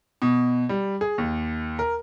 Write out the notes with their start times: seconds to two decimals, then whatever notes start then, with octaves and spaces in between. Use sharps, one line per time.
0.22 B2
0.69 G3
1.01 G#4
1.18 D#2
1.79 A#4